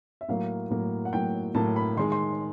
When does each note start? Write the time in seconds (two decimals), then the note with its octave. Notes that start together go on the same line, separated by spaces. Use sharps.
0.21 E5
0.28 A2 F#3 A#3 F5
0.70 A2 F#3 A#3
1.05 F#5
1.13 A2 F#3 A#3 G5
1.55 A2 F#3 A#3 A5
1.76 B5
1.97 D#3 G#3 C6
2.12 C6